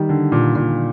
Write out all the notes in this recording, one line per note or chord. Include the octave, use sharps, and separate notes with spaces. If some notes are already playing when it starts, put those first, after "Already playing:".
Already playing: D#3 G3
D3
A#2
A#2